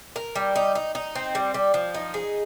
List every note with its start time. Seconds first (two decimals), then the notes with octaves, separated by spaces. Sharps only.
0.16 A#4
0.35 G3
0.56 D#4
0.75 D#4
0.95 D#4
1.15 C4
1.35 G3
1.54 G3
1.74 F3
1.94 D#4
2.14 G#4